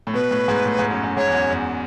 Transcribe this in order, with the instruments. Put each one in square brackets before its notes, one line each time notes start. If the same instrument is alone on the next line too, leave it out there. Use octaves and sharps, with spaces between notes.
[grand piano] A2
[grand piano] B2 [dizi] B4
[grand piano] A2
G#2
A2
G#2
F#2
F#2
[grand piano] G#2 [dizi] C#5
[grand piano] E2
F#2
E2